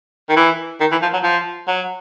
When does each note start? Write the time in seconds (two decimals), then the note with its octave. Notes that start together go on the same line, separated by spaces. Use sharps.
0.29 D#3
0.36 E3
0.80 D#3
0.91 E3
1.02 F3
1.14 F#3
1.24 F3
1.68 F#3